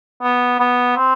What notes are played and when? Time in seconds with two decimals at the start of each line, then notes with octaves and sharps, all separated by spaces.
0.22 B3
0.60 B3
0.96 C4